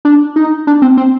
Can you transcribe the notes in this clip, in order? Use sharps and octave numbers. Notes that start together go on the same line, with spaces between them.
D4
D#4
D4
C4
C4